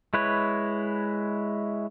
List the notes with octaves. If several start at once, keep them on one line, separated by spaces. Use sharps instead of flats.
G#3 E4 B4 C#5